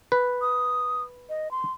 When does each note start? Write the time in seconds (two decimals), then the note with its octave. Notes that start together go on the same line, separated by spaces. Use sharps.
0.12 B4
0.41 D#6
1.29 D#5
1.51 C6